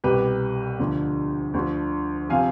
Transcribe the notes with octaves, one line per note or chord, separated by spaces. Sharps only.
C2 B2 G4 B4
D2 D3 F3
D2 D3 F3
C3 F3 F5 G#5